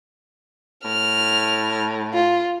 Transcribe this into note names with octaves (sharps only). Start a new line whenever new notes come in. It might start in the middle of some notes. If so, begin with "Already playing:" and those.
A2 F6
F4